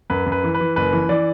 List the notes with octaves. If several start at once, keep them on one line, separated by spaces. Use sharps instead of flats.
F#2 B4
F#2
B4
E3
B4
E3
F#1 B4
E3
E3 D5